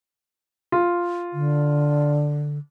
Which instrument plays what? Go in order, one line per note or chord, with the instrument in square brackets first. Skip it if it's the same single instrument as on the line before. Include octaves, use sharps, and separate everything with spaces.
[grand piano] F4
[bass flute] D3